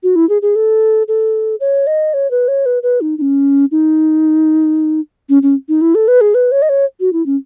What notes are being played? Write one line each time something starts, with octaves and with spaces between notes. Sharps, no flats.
F#4
E4
G#4
G#4
A4
A4
C#5
D#5
C#5
B4
C#5
B4
B4
D#4
D#4
C#4
D#4
C#4
C#4
D#4
E4
A4
B4
G#4
B4
C#5
D#5
C#5
F#4
E4
C#4